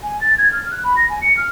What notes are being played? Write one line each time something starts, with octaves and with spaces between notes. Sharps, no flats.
G#5
A6
G#6
F6
F#6
B5
A#6
G#5
C#7
F6